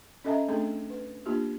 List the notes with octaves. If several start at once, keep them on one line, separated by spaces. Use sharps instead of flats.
C#4 A4 D#5 E5 A5 A#5
A3 C4 D4 G#4 A4
B4
A#3 D4 F4 G4